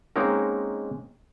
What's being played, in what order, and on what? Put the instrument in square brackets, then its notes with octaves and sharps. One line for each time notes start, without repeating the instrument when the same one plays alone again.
[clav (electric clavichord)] G#3 A#3 C4 C#4 D#4 A#4